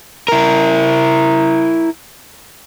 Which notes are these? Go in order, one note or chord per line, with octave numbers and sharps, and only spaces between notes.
E4 A#4